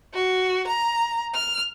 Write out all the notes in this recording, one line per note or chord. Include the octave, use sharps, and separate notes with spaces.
F#4
A#5
F6